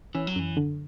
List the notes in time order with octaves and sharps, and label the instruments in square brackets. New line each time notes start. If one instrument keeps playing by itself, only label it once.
[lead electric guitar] E3 [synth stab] C#4
[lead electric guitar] F#3
[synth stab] F#2 [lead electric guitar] E3
[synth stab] D3